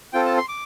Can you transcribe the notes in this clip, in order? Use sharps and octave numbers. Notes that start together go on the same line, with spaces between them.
C4 F4 A4 G5
A5
C6
D6